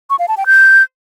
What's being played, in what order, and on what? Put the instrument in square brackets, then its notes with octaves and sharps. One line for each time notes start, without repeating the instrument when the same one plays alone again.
[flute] C#6
F5
A5
G5
G6